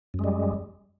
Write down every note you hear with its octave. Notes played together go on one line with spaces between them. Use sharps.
F#2 G3 G#3